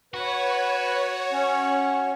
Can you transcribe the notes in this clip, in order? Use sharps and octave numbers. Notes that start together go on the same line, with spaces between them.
F#4 B4 C#5
C#4